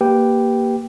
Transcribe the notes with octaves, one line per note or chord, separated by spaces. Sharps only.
A#3 G4 B4 G5